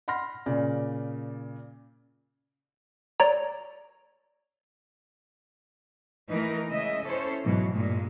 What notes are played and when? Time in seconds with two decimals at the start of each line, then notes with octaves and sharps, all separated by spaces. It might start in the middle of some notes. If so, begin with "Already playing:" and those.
0.08 F#5 B5 C6 F6 A#6
0.46 A#2 C#3 D5
3.20 C#5 D5 A#5
6.30 E3 A3 D#4 A#4
6.67 C#3 G#3 D#5 E5
7.05 C#4 E4 A4 C5 C#5
7.43 G#2 B2 E3 F#3
7.74 G2 A#2 G#3